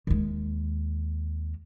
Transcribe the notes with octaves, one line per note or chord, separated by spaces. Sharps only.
D#2 G#3